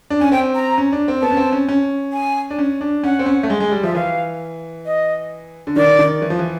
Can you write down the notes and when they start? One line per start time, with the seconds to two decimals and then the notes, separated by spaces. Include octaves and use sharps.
0.10 D4
0.21 C#4 G#5
0.31 C4 G5
0.55 A#5
0.78 C#4
0.93 D4
1.08 C4
1.22 B3 A5
1.31 C#4
1.37 C4
1.52 C#4
1.69 C#4
2.13 G#5
2.50 D4
2.59 C#4
2.81 D4
3.04 C#4 F#5
3.19 C4
3.26 C#4
3.43 A3
3.50 G#3
3.60 G#3
3.72 G3
3.83 F3 E5
3.95 E3 F5
4.86 D#5
5.67 D3
5.76 D#3 D5
5.99 D#3
6.22 E3
6.30 F3
6.39 E3